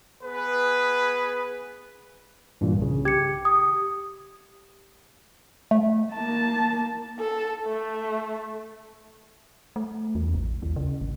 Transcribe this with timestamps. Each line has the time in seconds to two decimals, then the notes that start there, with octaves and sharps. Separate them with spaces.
0.22 B3 G#4 B4
2.61 G2 A#2 E3
2.78 B1 C#3
3.05 G4 G#6 C#7
3.45 D#6
5.71 A3
6.14 A#3 A5
7.19 A4
7.66 A3
9.76 A3
10.15 E2
10.34 A1
10.63 D#2
10.76 C#3
11.01 G#1